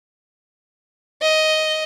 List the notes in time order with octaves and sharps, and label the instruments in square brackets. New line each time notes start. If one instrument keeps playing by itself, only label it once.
[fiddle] D#5